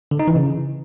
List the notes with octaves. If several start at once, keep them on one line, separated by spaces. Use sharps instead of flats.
D3
D#4
E3
C#3